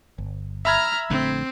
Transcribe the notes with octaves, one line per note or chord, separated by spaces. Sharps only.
G1
E5 A#5 B5 F6 G#6
A#1 D3 A3 C4